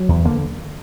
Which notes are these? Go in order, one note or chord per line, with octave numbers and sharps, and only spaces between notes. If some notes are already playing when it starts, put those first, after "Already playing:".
Already playing: F#3
E2
D3 A#3